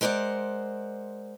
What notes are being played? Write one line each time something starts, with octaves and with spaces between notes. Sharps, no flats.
G#3 A#4 C5 D5 F#5